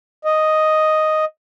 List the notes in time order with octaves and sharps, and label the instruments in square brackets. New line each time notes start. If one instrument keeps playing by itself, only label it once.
[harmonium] D#5